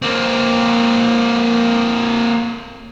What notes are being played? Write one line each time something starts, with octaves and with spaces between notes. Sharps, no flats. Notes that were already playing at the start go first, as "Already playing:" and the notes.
A#3 C4